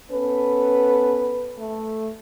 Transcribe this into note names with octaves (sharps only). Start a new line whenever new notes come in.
B3 C#4 A4 B4
A3